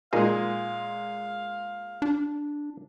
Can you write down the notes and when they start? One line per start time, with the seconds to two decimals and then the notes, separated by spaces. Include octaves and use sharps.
0.13 A#2 G#3 A#3 D#4 G#4 F5
2.02 D4